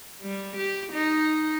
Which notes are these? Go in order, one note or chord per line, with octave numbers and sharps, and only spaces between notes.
G3
G4
D#4